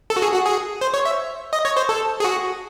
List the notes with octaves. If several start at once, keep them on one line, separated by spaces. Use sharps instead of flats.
A4
F#4
G#4
F#4
G#4
C5
C#5
E5
D#5
C#5
C5
A4
G#4
F#4